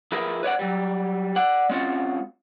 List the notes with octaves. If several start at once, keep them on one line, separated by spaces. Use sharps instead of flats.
F3 E4 G#4 A#4 B4
B4 C#5 D5 F#5
F#3 G3
D5 F#5
G#3 C4 C#4 F4 F#4